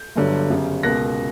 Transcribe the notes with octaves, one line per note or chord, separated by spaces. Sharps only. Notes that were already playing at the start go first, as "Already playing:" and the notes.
Already playing: G6
G1 G2 D3 F#3
G1 F#2 C#3 G3
C#2 B2 A#3 F#6 A#6